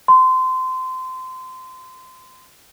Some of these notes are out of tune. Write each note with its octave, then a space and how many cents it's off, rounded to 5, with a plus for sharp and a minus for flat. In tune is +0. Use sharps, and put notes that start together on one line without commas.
C6 -25